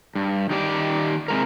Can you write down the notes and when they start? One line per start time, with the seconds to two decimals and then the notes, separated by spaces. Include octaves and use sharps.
0.15 G2
0.50 D#3 G4 D5
1.28 C3 G#3 A#4